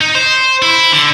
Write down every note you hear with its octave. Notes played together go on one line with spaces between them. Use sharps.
D#4
C5
E4
D3